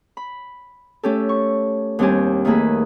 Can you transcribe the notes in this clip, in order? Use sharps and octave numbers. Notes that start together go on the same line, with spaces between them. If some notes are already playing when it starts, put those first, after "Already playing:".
B5
A3 C#4 G4 A4
C#6
D#2 G3 C4 D4 G4 G#5
D#3 A3 A#3 G#4 B4